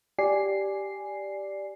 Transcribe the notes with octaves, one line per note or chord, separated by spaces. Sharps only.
G4 D5 G#5 C7